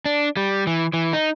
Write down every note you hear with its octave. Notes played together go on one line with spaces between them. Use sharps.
D4
G3
E3
E3
D#4